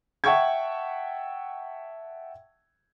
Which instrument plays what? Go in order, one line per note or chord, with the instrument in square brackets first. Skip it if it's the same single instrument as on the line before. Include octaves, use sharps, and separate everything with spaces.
[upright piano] E5 F#5 G5 A5 C#6 G#6